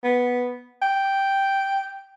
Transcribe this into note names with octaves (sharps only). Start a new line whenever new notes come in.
B3
G5